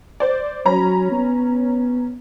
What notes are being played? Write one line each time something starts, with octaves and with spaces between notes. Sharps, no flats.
C5 D5
F#3 C#4 A#5 B5
B3